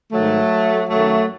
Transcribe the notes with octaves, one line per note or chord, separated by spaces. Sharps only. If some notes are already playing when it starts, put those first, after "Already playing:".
G#2 D#3 F#3 A3
F#2 D#3 F#3 A3